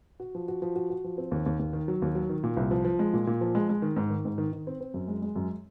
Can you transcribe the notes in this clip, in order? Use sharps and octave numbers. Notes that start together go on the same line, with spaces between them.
F#4
F3
F#4
F3
F#4
F#4
F3
C4
D#2
D#2
D#2
D#3
F#3
D#2
F#3
D#3
A#2
C2
F3
F3
G#3
A#2
A#2
F3
G#3
G#3
D#3
G#2
D#3
G#2
D#3
D#3
C4
C4
F#2
G#3
G#3
F#2